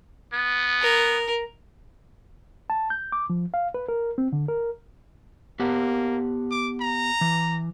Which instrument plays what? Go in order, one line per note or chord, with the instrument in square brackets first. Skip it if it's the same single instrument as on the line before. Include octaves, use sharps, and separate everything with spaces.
[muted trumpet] B3
[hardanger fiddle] A#4
[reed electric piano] A5
G6
D6
F3
F5
B4
A#4
C4
D3
A#4
[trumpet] A#3 [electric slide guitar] B3 G4 F#5
[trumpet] D6
A#5
[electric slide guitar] E3